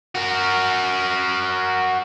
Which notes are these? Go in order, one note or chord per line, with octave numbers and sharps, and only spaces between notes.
F#4 A#4